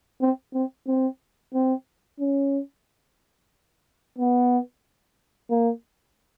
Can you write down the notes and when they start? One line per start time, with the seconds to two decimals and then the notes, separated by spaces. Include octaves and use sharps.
0.21 C4
0.54 C4
0.88 C4
1.54 C4
2.20 C#4
4.19 B3
5.50 A#3